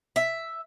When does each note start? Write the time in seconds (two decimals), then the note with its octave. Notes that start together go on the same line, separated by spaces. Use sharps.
0.16 E5